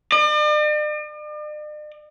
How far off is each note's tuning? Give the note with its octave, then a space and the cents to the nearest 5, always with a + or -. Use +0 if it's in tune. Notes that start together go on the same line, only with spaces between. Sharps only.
D5 +45